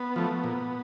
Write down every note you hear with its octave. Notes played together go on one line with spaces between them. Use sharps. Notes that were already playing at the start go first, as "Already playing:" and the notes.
Already playing: B3
F3 A3
A#2